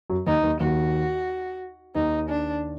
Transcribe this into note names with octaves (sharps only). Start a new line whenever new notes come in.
F#2 F#3
D#2 D#3 D#4
D#2 D#3
D#2 D#3 F#4
D#2 D#3 D#4
D4